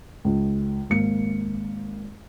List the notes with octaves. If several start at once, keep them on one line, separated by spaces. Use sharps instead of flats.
C#2
G#1 A#3 C#7